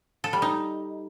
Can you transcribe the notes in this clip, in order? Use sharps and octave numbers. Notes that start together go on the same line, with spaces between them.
A4
G3
D#4